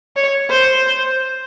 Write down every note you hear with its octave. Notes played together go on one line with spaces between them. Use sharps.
C#5
C5